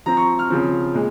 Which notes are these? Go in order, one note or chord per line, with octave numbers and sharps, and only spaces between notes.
F3 C4 A#5
C#6
F6
C#3 F3 C4
A#2 G#3